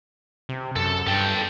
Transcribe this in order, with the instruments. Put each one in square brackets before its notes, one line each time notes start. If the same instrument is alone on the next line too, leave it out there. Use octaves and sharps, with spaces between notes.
[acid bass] C3
[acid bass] F#2 [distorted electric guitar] A4
[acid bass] G2 [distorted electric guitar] A4 G5